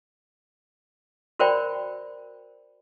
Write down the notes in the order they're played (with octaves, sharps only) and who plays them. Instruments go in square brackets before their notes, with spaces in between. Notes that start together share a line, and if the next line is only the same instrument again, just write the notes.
[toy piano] F#4 A#4 C5 D5 G5 B5